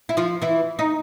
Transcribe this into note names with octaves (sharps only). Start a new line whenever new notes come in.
E4
F3 F4
E3 E4
D#4